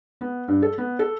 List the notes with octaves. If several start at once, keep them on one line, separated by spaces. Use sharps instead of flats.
B3
G2
A4
B3
A4